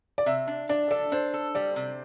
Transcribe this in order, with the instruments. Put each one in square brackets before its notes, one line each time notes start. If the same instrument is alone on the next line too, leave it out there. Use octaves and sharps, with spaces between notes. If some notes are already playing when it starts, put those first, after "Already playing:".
[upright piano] D5
[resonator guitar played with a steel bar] C3 [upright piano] E5
[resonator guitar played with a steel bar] D4
[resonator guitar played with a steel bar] D4 [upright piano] D5
[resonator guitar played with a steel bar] A4 [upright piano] D5
[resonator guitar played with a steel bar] D4 [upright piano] C5
[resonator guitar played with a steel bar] A4
[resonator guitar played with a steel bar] G3 [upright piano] D5
[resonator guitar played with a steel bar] C3